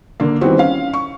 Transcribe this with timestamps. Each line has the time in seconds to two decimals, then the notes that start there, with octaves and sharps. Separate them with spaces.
0.20 D3 A#3
0.41 D#3 E3 G3 B3 C4 F#4
0.58 C#4 F5
0.94 C#6